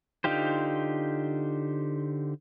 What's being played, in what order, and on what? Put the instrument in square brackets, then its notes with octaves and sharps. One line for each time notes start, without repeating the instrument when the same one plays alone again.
[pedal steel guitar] D3 D#4 F4 G4 C5